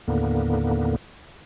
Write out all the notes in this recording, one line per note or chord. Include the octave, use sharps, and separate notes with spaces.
D#2 A2 D3 A#3 B3